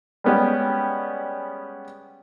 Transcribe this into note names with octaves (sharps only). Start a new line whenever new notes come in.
G3 G#3 B3 C#4 G4